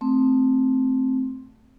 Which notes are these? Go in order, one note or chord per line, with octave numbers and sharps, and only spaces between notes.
A3 C4